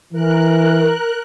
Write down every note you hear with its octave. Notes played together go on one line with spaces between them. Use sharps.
E3 A#4 F#6